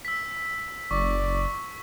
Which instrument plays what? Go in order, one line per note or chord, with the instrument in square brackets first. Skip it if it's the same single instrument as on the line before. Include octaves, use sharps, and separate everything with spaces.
[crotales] E6 B6
[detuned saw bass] F#1 [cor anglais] D5 [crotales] C#6